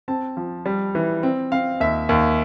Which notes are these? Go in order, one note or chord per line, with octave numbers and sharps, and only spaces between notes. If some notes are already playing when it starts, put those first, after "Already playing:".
C4 A5
F3
G3
E3
C4
C4 F5
D#2 E5
D#2